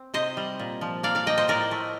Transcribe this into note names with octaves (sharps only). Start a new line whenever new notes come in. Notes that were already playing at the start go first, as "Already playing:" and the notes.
Already playing: C4
C3 C5 D#5
G3
A#2
F3
A#3 D5 F5
D5 F5
A#3 D#5 G5
C5 D#5
A2 A#4 D5
A3